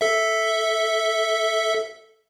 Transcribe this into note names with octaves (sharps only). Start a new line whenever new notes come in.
A4 E5